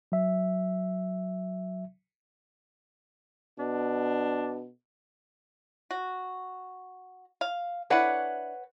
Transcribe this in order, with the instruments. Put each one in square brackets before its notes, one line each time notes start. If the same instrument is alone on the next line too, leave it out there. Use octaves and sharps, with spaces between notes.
[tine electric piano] F#3 E5
[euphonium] B2 [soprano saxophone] D4
[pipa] F#4
F5
[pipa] D4 E4 [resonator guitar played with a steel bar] B4 C#5 F#5